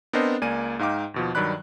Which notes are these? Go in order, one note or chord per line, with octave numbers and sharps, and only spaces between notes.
B3 C4 D4 A#4 C5 D#5
C#2 A#3 D5 G#5 D#7
G#2 D#4 F5 G5 D6
D#2 B2 F3
G2 D#3 F#3 D5 B5 F#6